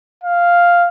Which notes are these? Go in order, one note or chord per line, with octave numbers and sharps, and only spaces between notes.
F5